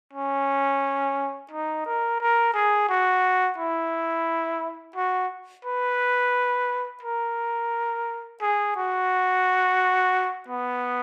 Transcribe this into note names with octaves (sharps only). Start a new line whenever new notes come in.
C#4
D#4
A#4
A#4
G#4
F#4
E4
F#4
B4
A#4
G#4
F#4
B3